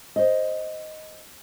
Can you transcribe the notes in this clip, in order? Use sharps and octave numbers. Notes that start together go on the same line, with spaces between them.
C5 D#5